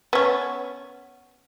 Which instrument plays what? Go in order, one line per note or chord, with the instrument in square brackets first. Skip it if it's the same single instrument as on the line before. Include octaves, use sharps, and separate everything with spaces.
[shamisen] B3 C#4